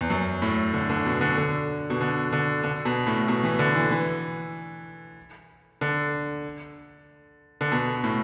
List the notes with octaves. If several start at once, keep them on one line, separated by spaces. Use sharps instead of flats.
E2
F#2
A2
D3
D3
B2
D3
D3
B2
D3
D3
D3
B2
A2
B2
E3
D3
E3
E3
D3
D3
B2
A2